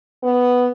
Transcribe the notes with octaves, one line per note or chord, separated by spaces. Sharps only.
B3